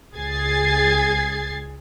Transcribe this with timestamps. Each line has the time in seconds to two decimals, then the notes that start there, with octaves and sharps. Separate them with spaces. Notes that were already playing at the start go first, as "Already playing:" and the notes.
0.15 C#2 G#4 G#6 A6 C7